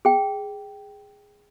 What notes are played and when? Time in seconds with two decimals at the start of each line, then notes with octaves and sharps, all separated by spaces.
0.05 G#4 G5